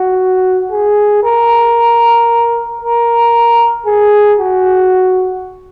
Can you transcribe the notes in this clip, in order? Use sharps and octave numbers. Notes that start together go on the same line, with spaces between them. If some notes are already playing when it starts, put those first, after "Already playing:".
Already playing: F#4
G#4
A#4
A#4
G#4
F#4